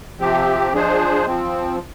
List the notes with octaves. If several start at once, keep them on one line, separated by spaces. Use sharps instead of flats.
C3 F3 C4 G4
F3 G#3 D4 G#4 C5
F3 C4